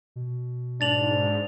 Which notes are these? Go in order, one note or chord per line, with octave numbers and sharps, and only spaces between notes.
B2
G#2 D4 A6 F7 F#7